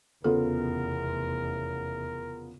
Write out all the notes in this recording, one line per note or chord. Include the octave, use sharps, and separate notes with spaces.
F1 E2 C#3 B3 F4 A4 A#4